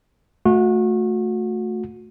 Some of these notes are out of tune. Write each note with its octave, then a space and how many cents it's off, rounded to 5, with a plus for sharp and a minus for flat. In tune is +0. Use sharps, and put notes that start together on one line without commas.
A3 +0 F#4 -30